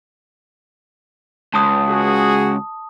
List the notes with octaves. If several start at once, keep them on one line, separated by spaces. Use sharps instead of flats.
C#2 A5 D#6
F#4 G#4